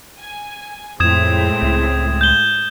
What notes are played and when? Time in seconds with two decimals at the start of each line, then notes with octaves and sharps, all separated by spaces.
0.19 G#5
1.00 F2 A2 G#3 C4 D#6 G#6 E7
1.62 C#2
2.21 G6 G7